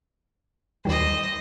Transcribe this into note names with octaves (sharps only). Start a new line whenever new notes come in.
D#2 D#3 G3 C5 D#5